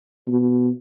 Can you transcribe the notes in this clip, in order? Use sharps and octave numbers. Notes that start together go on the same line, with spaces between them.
B2